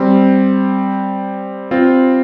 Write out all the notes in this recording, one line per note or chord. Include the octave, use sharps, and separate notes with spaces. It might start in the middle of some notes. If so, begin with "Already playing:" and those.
Already playing: G3 C4
C4 F4